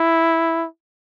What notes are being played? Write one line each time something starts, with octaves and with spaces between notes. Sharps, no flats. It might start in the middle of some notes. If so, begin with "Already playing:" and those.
Already playing: E4